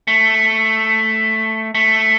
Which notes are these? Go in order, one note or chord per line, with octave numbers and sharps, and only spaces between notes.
A3
A3